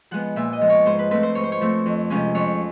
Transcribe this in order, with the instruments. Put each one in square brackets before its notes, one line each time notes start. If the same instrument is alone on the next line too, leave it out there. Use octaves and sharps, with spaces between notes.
[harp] F3 G#3 B3 F#5
A#2 E5
D#5
F3 G#3 B3
C#5
G#2 C5
B4
F3 A3 C4 B4
C5
G#2 C#5
C5
C#5
F3 A3 C4
F2
C3 F3 G#3 C#4
F2 C#5